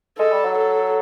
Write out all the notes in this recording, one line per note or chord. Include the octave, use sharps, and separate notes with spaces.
G#3 A4
G3
F#3
A4